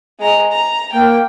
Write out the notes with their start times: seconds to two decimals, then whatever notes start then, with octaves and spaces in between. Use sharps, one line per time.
0.19 G#3 A#5
0.52 A#5
0.92 A#3 G5